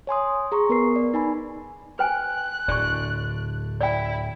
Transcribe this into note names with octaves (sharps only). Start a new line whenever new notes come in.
C#5 G#5 C6 D#6
G#4 A#5 C6 C#6
B3 A#4 B4 C7
D5
D#4 G#5 B5
B4 G5 G#5 F#6
D1 D3 D5 C#6
E4 D5 G5